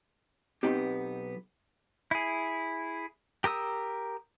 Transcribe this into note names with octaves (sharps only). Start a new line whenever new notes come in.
B1 B3 C4 D#4 G4
E4 G#4
G4 A#4 D#6 E6